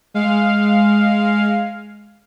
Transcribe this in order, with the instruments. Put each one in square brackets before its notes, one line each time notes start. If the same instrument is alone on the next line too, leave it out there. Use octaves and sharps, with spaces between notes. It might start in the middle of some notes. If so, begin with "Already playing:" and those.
[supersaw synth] G#3 F5